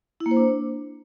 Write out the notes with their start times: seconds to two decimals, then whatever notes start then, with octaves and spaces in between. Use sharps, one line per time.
0.20 E4
0.26 A#3
0.31 C5
0.37 D4